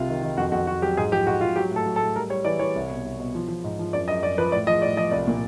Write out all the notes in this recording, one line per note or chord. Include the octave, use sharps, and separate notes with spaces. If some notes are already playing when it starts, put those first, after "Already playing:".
Already playing: C2 C3 F4
D#3
D#3
F2 F#4
F2 F#4
F2 F#4
F#3 G4
G#2 G#4
F3 G4
G#2 F#4
G#2 F4
F#3 G4
A2
A4
F#3
A4
A2
G3 A#4
G3 C#5
E3 D5
E3 C#5
C2
B2
C2
B2
F3
F3
G#2
F3
F#2 D5
F#2 D#5
F#2 D5
F3 B4
A2 D5
F3 D#5
A2 D5
F3 D#5
C2 D5
A#2